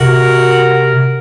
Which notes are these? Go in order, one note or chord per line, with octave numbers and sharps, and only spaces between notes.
C3 F#4 A#4